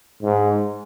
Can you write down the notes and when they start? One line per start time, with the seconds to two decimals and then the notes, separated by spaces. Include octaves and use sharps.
0.22 G#2